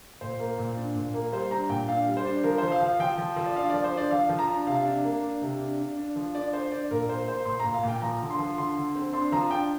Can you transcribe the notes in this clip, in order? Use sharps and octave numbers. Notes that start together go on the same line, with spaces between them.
A#2 C5
A#3
A#2
D4
A#2
A#3
G3 C5
D4 A#5
A#2 G5
D4 F5
G3
C5
D4
F3 A#4
F3 C5
F5
F3
F5
F3 G5
F3
F3
D5
D4 F5
F3 D5
C5
D4 D5
F3 F5
F3
A#5
D4
C3 F5
D4
A#3
D4
C3
D4
D4
D4
F3
D4 D5
D4 C5
D4 D5
A#2 A#4
A#3 C5
A#3 C5
A#2 C6
A#2 A#5
F5
A#2 G5
F3 A#5
D3
C6
F3
D3 C6
D3
C4
D4 C6
F3 A#5
D4 G5